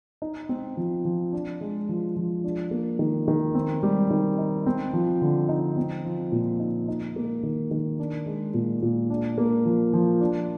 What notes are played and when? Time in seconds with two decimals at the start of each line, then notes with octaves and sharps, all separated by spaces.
0.22 D#4
0.49 C4
0.77 F3
1.05 F3
1.33 D4
1.61 G#3
1.89 F3
2.16 F3
2.44 D4
2.71 A#3
2.99 D#3
3.28 D#3
3.55 C4
3.83 G3
4.11 D#3
4.38 D#4
4.66 C4
4.93 F3
5.22 D3
5.49 D#4
5.77 C4
6.05 F3
6.32 A#2
6.60 D#4
6.88 D#4
7.16 A#3
7.43 D#3
7.71 D#3
7.99 D4
8.26 G#3
8.54 A#2
8.82 A#2
9.10 D4
9.38 A#3
9.65 F3
9.93 F3
10.21 D4